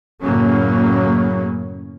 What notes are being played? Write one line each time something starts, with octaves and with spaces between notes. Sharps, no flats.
F#2 A2 C#3 F#3 A#3 C#4